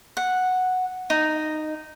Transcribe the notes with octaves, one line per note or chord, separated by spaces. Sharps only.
F#5
D#4